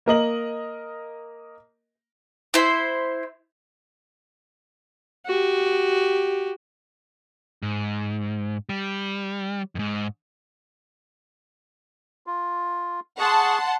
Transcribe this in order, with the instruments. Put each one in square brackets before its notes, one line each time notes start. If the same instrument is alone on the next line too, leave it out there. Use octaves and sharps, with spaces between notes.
[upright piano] A#3 A#4 D#5 F#7
[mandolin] E4 C5
[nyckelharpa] F#4 G4
[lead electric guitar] G#2
G3
F2 G#2
[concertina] F4
[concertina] G#4 C#6 [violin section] F#5 A5 C6